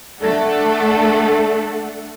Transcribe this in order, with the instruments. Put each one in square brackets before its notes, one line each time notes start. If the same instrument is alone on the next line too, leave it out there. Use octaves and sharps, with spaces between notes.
[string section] A3 D4 A4 F#5